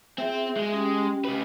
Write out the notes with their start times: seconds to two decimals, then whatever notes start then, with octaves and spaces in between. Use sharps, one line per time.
0.18 C4 F4 G#4 E5
0.57 G#3
0.73 C#4 G4 G5
1.25 C#3 B4